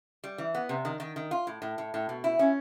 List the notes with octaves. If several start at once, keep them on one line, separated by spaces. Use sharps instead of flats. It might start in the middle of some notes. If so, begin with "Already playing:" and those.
G3
E3
B3
C3
D#3
D#3
D#3
F4
A2
A2
A2
A2
B2
E4
C#4